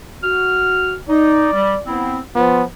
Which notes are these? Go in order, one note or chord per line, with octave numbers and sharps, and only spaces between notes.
F#4 F6
D#4 D5
G3
B3 C4 E4
F3 B3 F4